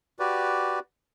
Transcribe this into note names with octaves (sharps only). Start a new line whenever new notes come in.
F#4 G4 B4 D5